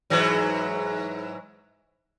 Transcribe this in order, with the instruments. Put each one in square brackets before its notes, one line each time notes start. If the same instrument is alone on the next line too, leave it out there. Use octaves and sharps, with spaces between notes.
[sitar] G#2 E3 F#3